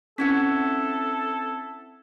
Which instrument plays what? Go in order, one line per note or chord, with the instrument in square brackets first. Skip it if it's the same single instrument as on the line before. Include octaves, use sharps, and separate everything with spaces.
[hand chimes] C4 G#6 B6 [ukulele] C#4 E4 F#5 [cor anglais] A4